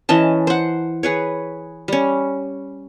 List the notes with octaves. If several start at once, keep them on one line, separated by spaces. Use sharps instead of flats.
E3 C#4 D#5 A5
C5 F#5
G#4 B4 C#5
G3 C#4